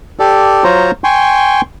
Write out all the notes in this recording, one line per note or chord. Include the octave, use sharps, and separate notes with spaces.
G4 A4 D5
F#3 F4 C5 C#5 A#5
G5 G#5 C6 C#6